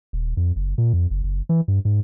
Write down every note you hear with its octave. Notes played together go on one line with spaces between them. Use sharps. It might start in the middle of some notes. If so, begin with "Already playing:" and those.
D#1
F2
F#1
A#2
F2
F#1
F#1
E3
G2
G#2